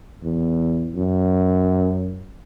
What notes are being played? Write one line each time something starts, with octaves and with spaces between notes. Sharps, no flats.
E2
F#2